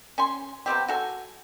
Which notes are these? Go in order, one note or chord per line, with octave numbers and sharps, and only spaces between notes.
C#4 G#5 C6
C3 B3 C4 G4
F#4 A4 G#5